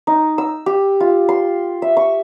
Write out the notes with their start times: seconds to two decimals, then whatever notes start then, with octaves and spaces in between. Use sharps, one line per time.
0.07 D#4
0.38 E6
0.66 G4
1.00 F4
1.29 C6
1.82 E5
1.97 C#6